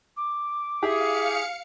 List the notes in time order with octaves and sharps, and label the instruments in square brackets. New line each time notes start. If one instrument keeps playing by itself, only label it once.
[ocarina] D6
[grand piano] E4 G4 [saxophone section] G#4 [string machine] F5 C#7